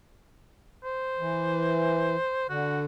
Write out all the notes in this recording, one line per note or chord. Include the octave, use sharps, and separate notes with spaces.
C5
E3
D3 F#4